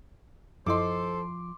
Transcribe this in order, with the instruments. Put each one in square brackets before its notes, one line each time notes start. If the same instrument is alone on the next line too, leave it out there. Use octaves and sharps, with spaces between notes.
[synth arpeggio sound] F#2 E4 D#5 [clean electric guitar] F3 [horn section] A4 C5 [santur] C6 D6